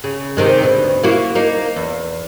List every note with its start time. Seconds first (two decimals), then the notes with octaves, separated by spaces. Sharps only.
0.04 C#3
0.37 C3 D#3 G#3
0.62 D2 B2
1.03 A#3 E4 F#4
1.35 A#3 D#4
1.76 E2